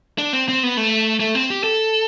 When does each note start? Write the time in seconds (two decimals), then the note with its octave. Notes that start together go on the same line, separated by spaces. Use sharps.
0.18 D4
0.33 C4
0.48 C4
0.63 B3
0.77 A3
1.20 A3
1.35 C4
1.50 G4
1.64 A4